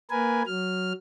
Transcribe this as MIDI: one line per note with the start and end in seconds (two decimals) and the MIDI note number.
0.11 0.43 58
0.11 0.43 70
0.11 0.43 71
0.11 0.43 80
0.47 0.93 54
0.47 0.93 89